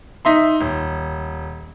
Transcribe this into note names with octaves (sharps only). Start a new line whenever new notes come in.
D#4 E5 C6
D#1